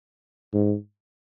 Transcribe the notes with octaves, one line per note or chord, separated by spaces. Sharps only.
G#2